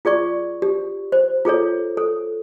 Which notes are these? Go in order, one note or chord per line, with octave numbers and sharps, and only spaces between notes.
F4 G#4 D5 C#6
G4
C5
F4 G#4 A4 C#5
A4